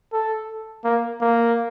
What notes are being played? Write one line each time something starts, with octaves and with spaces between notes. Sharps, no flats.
A4
A#3
A#3